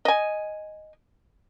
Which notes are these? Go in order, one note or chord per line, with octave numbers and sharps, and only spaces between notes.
D#5 G#5